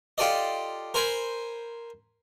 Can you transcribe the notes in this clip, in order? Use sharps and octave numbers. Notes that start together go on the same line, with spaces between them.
F4 G4 A4 D5 D#5
A#4 C5 G#5 B5